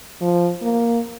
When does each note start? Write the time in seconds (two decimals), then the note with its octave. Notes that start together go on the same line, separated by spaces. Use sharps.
0.21 F3
0.62 A#3